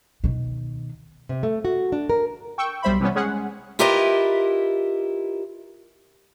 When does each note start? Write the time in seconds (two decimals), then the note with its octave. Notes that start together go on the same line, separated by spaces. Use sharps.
0.24 B2 D#3
1.29 C3
1.43 A3
1.65 F#4
1.92 D4
2.10 A#4
2.58 G5 C#6 E6
2.82 B1 G3 C5 E5 B5
3.00 C3 E3 G3 B3 C#4
3.15 G#3 C#4 G#4 F#5
3.79 E4 F4 G4 A#4 B4 D#5